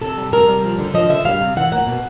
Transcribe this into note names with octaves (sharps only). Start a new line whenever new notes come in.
C3 A4
G3
C3 A#4
G3
F3
D3
F3 D#5
D3 E5
G3 F5
C3
E3 F#5
A#3 F#5
B2